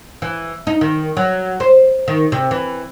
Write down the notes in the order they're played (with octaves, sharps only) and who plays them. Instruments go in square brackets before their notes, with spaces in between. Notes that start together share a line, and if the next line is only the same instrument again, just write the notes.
[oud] E3
D#4
D#3
F#3
C5
D#3
C3
E3